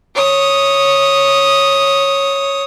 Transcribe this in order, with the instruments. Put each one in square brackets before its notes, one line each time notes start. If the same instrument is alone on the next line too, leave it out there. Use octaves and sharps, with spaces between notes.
[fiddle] C#5 D#6